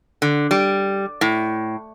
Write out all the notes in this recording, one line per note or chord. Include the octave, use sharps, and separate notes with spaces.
D3
G3
A2